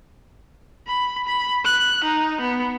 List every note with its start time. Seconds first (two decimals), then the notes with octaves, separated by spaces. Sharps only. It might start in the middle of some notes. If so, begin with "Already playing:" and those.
0.87 B5
1.27 B5
1.65 F#6
2.04 D#4
2.41 B3